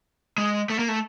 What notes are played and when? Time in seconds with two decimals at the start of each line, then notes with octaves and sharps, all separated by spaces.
0.38 G#3
0.70 A3
0.79 A#3
0.89 A3